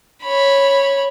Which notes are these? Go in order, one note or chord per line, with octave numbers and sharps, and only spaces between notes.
C#5 B5